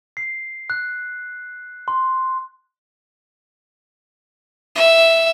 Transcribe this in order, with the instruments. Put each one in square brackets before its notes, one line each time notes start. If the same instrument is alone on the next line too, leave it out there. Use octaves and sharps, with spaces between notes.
[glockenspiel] C7
F#6
C6
[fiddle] E5